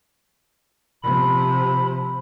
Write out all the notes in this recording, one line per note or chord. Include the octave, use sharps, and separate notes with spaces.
C3 F3 B5